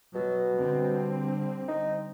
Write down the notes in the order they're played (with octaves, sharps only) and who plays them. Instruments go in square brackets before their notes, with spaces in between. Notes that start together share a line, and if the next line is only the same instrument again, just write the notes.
[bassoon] B2 [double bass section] F#3
[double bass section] D3 G3 C4
[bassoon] D#4